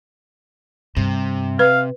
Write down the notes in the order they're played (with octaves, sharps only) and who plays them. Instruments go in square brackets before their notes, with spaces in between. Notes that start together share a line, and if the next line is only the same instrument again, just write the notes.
[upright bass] G2 [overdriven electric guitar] C3
[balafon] B4 [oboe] F5